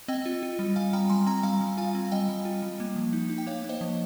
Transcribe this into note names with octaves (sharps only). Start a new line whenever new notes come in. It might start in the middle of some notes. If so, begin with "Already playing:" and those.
C4 D#5 G5
F4
F4
G3
G3 F5 G#5
G3 G5 A#5
G3 G#5 C6
C4 G5 A#5
G3 F5 G#5
G3
F4 F5 G#5
C4
G#5
G3 D#5 G5
G3
F4
G3
A#3
F3
D#4
D#4
G5
A#3 C#5 F5
A#3
C5 D#5
F3